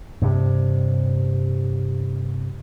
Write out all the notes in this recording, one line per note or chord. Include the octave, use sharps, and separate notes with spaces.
G2 C3